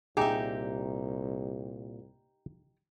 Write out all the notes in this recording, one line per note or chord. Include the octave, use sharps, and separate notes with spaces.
C2 A#2 D#4 G4 G#4 E5